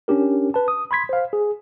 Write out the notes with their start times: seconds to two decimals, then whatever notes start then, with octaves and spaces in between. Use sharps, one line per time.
0.08 C#4 D4 G4 A#4
0.54 B4 A5
0.68 D#6
0.91 B5 C6 G#6 B6
1.09 C5 F5
1.33 G#4